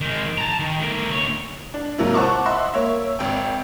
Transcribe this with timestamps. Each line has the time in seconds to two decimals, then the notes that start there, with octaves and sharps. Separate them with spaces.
0.01 D#3 G#3
0.38 A5 A#5
0.59 D#3
0.80 A3 A#4
1.10 D2 C#5
1.74 D4
1.98 G#2 C3 F#3 A#3 E4
2.14 C5 F#5 A5 C#6 D6
2.46 D#5 E5 F#5 C6
2.74 A#3 C#5 E5
3.19 G#1 C4 G5